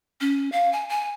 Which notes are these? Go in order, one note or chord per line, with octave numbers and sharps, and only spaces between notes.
C#4
F5
G#5
G#5